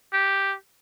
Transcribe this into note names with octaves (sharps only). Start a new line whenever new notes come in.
G4